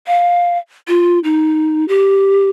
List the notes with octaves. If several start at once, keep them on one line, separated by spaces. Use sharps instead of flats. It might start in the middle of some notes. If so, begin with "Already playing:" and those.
F5
F4
D#4
G4